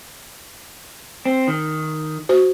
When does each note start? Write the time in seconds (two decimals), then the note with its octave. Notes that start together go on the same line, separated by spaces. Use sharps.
1.25 C4
1.48 D#3
2.29 F#4 C5